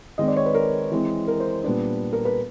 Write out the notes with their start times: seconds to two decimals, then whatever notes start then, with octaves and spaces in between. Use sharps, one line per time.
0.18 D#3 G#3 C4 D#5
0.28 D5
0.37 C#5
0.46 B4
0.54 A#4
0.91 E3 G#3 C4
1.28 A#4
1.40 C5
1.64 A#2 G3 B3 D4
2.13 A#4
2.25 B4